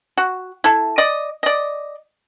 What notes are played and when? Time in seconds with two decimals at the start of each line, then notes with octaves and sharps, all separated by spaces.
0.17 F#4
0.64 E4 A4
0.98 D5 D#5
1.43 D5 D#5